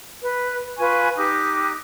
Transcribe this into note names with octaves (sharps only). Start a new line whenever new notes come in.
B4
F4 B4 G#5 C#6
D#4 G4 D6 F#6